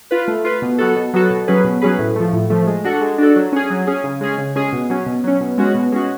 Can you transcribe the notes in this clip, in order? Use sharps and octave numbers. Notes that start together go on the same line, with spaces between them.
F4 B4
A3
F4 B4
B2
F#3 B3 F#4 A4
B2
F#3 B3 F#4 A4
B2
F#3 C#4 G#4 B4
B2
F#3 C#4 G#4 B4
A2
F3 A3
A2
F3 A3
G#3
D4 F#4 A4
G#3
D4 F#4 A4
F#3
C#4 G#4
F#3
C#4 G#4
C#3
G#3 C#4 G#4
C#3
G#3 C#4 G#4
B2
F#3 C#4
B2
F#3 C#4
B2
G#3 C#4 F#4
B2
G#3 C#4 F#4